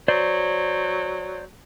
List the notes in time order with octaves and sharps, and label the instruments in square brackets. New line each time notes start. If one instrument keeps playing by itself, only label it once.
[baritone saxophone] F#3 [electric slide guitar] C5 D5